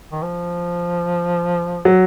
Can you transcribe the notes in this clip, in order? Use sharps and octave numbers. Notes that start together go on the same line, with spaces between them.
D#3
F3
F#3